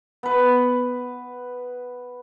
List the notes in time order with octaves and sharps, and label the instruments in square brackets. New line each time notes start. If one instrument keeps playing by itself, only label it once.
[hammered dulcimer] B3 B4